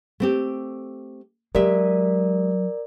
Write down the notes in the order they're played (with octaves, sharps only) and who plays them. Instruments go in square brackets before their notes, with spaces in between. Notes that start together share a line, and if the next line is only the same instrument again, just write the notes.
[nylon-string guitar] A3 C4 G4
[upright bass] F#3 [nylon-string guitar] G#3 G4 E5 [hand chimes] A#4 D5